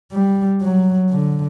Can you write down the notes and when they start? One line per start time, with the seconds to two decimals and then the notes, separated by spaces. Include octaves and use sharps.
0.12 G3
0.62 F#3
1.10 D3